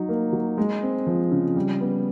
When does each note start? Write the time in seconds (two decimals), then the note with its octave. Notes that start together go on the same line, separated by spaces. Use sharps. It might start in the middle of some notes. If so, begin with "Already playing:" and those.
Already playing: F#3 D#4
0.09 A#3
0.33 F#3
0.58 G#3
0.83 C4
1.07 F3
1.31 C#3
1.56 G3
1.81 B3